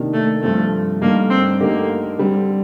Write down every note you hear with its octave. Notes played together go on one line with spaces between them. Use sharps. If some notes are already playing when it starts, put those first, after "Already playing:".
Already playing: C3 D#3 A#3 D4
A3
G2 F3 A3 C4
G2 D3 A3 A#3 D#4
C4
D3 A3 A#3 D#4 G4 A#4
D3 G3 C4